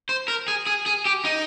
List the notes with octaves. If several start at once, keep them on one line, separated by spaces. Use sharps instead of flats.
C5
A#4
G#4
G#4
G#4
G4
D#4